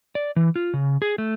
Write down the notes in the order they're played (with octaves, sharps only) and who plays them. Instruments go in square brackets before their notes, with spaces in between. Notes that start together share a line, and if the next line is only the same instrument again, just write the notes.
[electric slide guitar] D5
E3
F4
C#3
G#4
A3